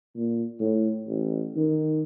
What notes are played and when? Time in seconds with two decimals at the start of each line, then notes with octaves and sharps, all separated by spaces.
0.15 A#2
0.60 A2
1.07 A1
1.56 D#3